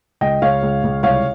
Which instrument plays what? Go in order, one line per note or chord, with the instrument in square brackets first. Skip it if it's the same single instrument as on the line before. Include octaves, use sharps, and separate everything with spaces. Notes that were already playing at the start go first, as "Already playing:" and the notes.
[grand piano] C#2 D#5 G5
C#2 C#5 F5
C#2
C#2
C2 C#5 F5